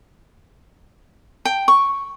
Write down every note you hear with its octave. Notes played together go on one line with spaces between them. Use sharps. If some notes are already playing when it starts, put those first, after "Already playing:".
G5
C#6